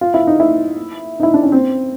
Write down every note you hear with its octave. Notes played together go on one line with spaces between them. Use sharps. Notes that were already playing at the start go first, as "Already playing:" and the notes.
F4
E4
D#4
E4
D#4
E4
D4
C#4
C4